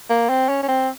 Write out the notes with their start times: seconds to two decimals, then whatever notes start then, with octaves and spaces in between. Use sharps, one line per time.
0.10 A#3
0.29 C4
0.49 C#4
0.63 C#4
0.68 C4